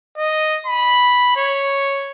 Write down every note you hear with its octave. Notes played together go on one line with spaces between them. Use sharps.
D#5
B5
C#5